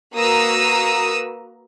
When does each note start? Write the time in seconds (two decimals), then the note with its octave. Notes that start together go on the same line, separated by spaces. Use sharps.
0.15 A#3 F#4 B4 A#5 D#6 E6